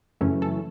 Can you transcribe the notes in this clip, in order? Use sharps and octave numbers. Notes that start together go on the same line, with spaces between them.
F#2 C#3 E3 A3 C#4
A4